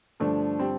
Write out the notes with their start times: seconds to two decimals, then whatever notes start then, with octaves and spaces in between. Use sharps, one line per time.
0.20 G2 D3 F3 A3 D4
0.59 G3 C4